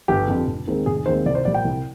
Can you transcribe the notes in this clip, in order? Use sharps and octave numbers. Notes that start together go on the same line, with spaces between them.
G1 G4
F2 D3
F1
D#2 D#3 G#3 C4
F1 G#4
D#2 D#3 G#3 C4 C5
C2 D5
C5
A#2 G3 D5
G5
C2